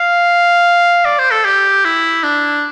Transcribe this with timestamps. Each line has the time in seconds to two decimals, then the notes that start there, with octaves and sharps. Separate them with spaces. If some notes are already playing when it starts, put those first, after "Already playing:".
Already playing: F5
1.05 D5
1.19 C5
1.31 A4
1.45 G4
1.85 E4
2.23 D4